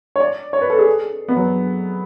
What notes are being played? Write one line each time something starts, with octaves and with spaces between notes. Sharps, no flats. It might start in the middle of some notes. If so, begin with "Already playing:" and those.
C#5
D5
C#5
B4
A4
G#4
B3
F#3